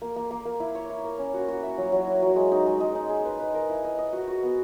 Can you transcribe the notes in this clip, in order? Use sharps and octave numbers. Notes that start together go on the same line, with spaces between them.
A#3
A#3
A#3
A#3
E4
C#5
E4
A#4
C#4
F#4
F#4
E5
F#3
F#3
E4
F#3
G#3
D#4
G#3
G#3
D#4
G#4
B4
B4
A#4
E4
D#5
D#5
F#4
F#4
B3